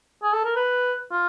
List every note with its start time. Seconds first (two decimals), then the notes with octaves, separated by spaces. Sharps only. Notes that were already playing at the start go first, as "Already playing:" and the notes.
0.23 G#4
0.33 A4
0.45 A#4
0.56 B4
1.11 F4